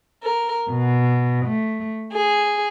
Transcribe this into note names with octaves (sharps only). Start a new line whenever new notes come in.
A#4
B2
A3
G#4